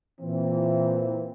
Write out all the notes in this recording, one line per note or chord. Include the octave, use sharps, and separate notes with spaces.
A#2 E3 C4